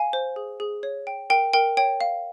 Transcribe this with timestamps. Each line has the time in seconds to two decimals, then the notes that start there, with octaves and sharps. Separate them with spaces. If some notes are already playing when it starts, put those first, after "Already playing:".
Already playing: F5 G#5
0.13 C5
0.36 G#4
0.60 G#4
0.83 C#5
1.07 G5
1.30 A#4 G5
1.53 A#4 G5
1.77 C#5 G5
2.01 F5